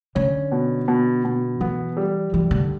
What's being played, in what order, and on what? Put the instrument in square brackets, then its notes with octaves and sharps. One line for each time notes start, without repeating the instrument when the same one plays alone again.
[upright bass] D3 [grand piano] C#4
[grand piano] B2
B2
B2
[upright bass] E3 [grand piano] B3
[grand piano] G3
[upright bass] E3 [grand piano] G3
[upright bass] D3